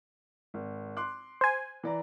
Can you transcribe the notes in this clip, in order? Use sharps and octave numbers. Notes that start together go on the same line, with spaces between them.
G#1
C6 D6 F#6
C5 G#5
E3 D5 A#5